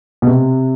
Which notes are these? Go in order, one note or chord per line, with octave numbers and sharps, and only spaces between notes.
B2
C3